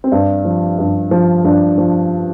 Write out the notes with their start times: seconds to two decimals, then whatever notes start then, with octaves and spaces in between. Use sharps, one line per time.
0.04 C4
0.12 G2 D4
0.45 F3
0.79 G2
1.11 F3
1.45 G2 D4
1.78 F3